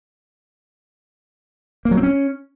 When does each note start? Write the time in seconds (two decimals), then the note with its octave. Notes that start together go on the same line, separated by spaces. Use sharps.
1.85 A#3
1.91 F#3
1.97 C4
2.03 C#4